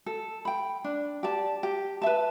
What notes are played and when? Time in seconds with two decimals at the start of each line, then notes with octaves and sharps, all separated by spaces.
0.06 A4
0.45 G5 B5
0.84 D4
1.23 G4 D5 A5
1.63 G4
2.02 B4 E5 A5